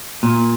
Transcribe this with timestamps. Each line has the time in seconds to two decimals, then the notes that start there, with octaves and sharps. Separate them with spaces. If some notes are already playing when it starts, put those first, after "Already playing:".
0.23 A#2